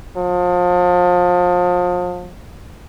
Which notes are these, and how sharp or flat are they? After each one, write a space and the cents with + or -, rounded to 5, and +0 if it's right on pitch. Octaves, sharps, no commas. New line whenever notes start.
F3 +35